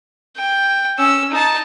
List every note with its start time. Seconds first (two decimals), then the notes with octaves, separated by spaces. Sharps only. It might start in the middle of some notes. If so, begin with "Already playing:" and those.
0.37 G5
0.98 C#4 E6
1.31 D#4 A5